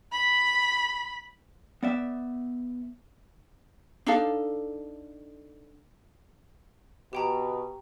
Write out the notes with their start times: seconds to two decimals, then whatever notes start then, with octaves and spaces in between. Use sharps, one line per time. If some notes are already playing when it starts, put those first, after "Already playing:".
0.12 B5
1.83 B3 D5 E5
4.06 D4 D#4 A4 F5
7.13 B2 G4 G5 A#5